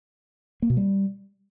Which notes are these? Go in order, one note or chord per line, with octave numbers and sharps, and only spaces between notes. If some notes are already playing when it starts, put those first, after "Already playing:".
A#3
B2
G3